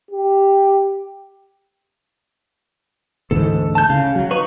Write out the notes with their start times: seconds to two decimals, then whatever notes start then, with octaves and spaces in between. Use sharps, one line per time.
0.11 G4
3.31 D2 G#2 E3 A4
3.75 A5 G6
3.90 C#3 F5
4.16 F#3
4.31 D#4 B4 C#6